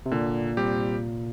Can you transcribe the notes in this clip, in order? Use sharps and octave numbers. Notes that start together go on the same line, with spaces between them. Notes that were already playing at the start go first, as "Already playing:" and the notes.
C3
A#2 D3
G3 C4 G4